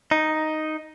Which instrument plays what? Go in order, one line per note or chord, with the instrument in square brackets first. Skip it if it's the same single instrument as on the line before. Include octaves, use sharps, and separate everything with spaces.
[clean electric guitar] D#4